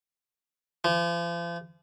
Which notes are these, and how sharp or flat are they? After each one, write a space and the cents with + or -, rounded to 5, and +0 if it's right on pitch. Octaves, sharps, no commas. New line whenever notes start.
F3 -40